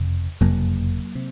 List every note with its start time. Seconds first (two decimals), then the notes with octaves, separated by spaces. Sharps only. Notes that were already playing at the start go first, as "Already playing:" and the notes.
Already playing: F#1 F2 C3
0.41 F#1 F2 C3 F#3 A#3
1.15 C3